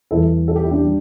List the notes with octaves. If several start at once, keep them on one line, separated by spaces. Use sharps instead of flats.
E2 E3 G3 E4 A4
A4
G4
E4
D4 G4
G3